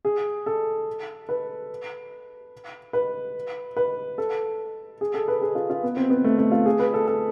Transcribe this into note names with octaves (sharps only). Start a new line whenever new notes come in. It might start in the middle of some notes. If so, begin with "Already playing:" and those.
G#4
A4
B4
B4
B4
A4
G#4
A4
B4
G#4
F4
F4
B3
C4
B3
A3
A3
F4
G#4
B4
A4
A4